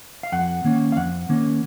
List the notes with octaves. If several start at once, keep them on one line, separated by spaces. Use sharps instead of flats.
F5
F2 F#5
D#3 A#3 C#4
F5
F2 F#5
D#3 A#3 C#4